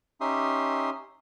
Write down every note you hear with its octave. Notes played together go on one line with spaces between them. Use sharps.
C#4 D#4 G4 E5 C6 D#6